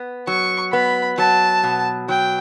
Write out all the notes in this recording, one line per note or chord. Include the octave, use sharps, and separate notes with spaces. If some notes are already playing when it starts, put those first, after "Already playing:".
Already playing: B3
F#3 C#6
B3 B5
F#3 A5
B2
F#3 G5